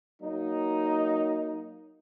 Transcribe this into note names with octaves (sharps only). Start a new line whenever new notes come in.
F#3 A#3 D#4